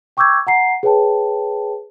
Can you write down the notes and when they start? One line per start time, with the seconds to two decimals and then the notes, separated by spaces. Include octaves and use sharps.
0.17 G5 C#6 D6 E6 G6 G#6
0.47 F#5 A#5 C7
0.83 G#4 B4 C#5 G5 A5